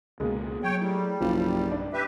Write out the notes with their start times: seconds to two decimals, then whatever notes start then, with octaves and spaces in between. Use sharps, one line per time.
0.20 C#2 B2 G#3 A#3 B3
0.63 F#3 C#5 G5
0.81 A2 G3
1.20 F#1 B1 G2 F3
1.71 D4
1.93 G4 B4 E5